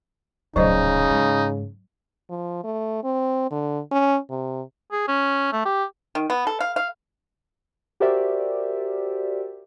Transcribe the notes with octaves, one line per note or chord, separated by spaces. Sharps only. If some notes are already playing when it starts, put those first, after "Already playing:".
D1 A#1 C#3 F#3 D#4 C5 D#5
G#2
F3
A3
C4
D3
C#4
C3
G#4
C#4
A3
G4
D#3
B3
A4
F5
F5
F#4 G4 A#4 C5 D5 E5